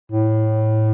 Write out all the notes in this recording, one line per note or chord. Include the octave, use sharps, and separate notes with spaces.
A2